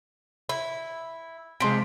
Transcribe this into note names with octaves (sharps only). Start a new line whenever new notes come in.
E4
C3 F3 G#3 C6 D7